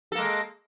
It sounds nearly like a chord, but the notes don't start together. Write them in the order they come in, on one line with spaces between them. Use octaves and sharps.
A4 A#3 G#3